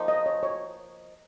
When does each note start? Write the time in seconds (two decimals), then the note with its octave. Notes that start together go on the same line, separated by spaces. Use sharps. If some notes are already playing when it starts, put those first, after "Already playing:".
Already playing: F3 A#3 D#4
0.08 D#5
0.26 C#5
0.43 C#5